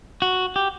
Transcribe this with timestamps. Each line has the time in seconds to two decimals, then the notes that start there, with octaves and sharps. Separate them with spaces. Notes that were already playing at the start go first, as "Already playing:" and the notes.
0.22 F#4
0.56 G4